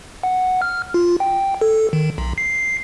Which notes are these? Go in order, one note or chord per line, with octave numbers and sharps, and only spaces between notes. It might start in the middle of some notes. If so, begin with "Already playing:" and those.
F#5
F6
F4
G5
A4
D#3
B1
C7